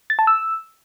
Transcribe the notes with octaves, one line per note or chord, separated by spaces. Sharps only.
A6
A5
E6